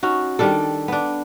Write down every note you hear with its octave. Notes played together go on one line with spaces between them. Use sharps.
C#4 D#4 F#4
D#3 G3 D4 A4
B3 D4